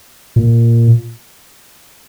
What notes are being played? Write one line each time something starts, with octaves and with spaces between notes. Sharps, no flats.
A#2